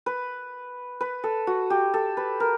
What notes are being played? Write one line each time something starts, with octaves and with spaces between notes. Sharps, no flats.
B4
B4
A4
F#4
G4
A4
B4
A#4